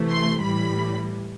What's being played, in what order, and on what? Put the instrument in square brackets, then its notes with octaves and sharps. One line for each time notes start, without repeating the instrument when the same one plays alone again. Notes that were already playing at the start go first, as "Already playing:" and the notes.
Already playing: [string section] C3 E3 A3
C6
A2 E3 G3 B5